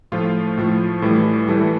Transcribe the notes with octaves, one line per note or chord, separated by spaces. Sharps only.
A2 F3 A3 F4
A2 F3 A3
A2 E3 G3
A2 E3 G3 A4